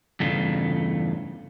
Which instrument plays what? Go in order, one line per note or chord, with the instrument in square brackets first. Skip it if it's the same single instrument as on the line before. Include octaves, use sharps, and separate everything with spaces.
[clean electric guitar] E2 G2 C#3 A3 F4